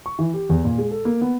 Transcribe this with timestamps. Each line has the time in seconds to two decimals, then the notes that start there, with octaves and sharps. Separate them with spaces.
0.06 C#6
0.19 E3
0.34 G4
0.49 E2
0.65 A#2
0.78 G#3
0.91 A4
1.05 A#3
1.21 B3